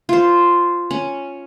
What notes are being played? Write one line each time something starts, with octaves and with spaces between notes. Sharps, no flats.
F4 C5
C#4